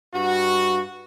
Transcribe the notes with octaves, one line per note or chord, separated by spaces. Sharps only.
G2 F#4